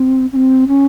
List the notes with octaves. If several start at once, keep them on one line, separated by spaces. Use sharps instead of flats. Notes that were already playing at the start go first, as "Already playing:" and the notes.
Already playing: C4
C#4
C4
C#4